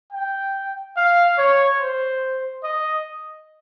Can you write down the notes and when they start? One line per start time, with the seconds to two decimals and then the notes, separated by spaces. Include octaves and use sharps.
0.13 G5
0.97 F5
1.38 C#5
1.80 C5
2.64 D#5